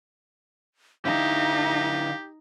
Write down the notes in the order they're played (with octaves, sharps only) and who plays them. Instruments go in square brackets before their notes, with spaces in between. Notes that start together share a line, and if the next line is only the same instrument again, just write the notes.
[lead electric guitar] D3 E4 [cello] D#4 [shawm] G4 [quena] F5